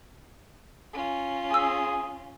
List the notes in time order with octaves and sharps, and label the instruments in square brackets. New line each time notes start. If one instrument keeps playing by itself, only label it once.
[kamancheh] C#4 F4
[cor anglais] G#4 [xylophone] G#5 E6